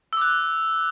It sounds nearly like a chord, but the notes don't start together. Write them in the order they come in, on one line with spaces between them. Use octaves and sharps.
E6 D6 F#6